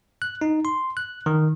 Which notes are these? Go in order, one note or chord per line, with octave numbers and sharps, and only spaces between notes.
F#6
D#4
C6
F#6
D#3